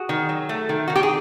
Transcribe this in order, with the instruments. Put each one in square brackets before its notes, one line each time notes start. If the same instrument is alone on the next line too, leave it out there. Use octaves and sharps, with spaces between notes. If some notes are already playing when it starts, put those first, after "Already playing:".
Already playing: [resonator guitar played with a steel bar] F#4 G#4
D#3
F#3
A3
D#3
D#3 F#4
G4
G#4